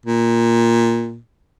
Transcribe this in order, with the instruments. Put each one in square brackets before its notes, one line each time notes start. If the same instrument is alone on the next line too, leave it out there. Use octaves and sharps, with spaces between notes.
[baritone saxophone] A#2